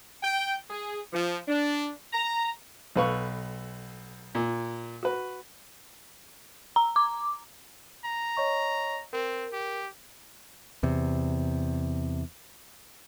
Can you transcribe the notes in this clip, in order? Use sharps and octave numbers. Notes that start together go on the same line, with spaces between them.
G5
G#4
F3
D4
A#5
B1 A4 B4 F5 C#6
A#2
F#4 B4
A#5
D6
A#5
C#5 D#5 C#6
C4 A#4
G4
E2 C3